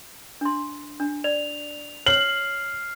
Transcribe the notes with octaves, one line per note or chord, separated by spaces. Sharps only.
D4 C6
D4
D5 F7
C#5 F6 C7 F#7